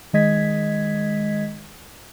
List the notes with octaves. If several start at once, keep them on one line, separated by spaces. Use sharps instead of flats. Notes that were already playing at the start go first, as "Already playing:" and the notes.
D#3 G#3 D#5 G#6 B6